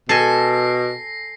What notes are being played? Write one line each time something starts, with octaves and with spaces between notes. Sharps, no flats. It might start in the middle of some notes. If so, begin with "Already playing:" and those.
B2 A4 G#5 A#6 C7